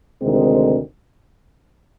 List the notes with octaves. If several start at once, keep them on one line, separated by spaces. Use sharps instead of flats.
D2 C3 D#3 G#3 C4